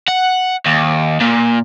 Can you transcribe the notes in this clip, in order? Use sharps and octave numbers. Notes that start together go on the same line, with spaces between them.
F#5
D#2
A#2